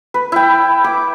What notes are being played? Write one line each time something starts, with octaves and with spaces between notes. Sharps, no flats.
B4
E4 G5
D6